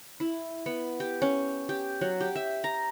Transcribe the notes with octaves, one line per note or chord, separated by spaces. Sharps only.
E4
B3
G4
C#4
G4
F#3
G4
E5
A#5